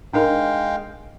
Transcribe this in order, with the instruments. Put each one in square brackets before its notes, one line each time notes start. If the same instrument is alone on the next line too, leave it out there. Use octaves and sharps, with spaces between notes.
[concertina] G#3 F5 G5 [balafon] D4 D#4 A#4